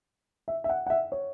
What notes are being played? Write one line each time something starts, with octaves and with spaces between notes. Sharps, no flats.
E5
E5
F#5
F#5
E5
C#5